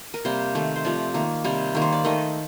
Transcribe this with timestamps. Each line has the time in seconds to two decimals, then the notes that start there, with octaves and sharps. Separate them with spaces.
0.14 A#4
0.25 C3 G3 A#3 C5
0.55 D#3 A3
0.76 C5
0.85 C3 F3 A3 D5
1.14 D#3 A#3
1.44 C3 G3 A#3
1.75 D#3 A#3
1.82 C5
1.93 D5
2.04 D#3 A3 D#5